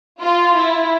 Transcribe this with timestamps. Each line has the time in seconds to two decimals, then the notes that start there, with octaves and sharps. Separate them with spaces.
0.22 F4
0.56 E4